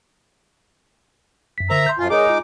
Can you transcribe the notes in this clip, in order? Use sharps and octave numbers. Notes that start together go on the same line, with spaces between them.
F#2 B6
D3 A#4 C5 E5 A#5
C6 G6
F#2 F4 G#5 A5
G#3 D#4 G#4 A#4 C#5 D6
F4